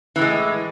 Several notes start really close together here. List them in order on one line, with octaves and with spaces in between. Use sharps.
E3 A2 G#3